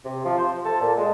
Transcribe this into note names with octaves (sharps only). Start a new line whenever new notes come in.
C3
F3
C5
A4
A#2
G#3